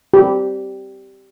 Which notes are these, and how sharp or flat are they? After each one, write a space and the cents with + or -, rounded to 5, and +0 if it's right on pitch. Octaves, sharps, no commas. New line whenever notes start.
G4 -10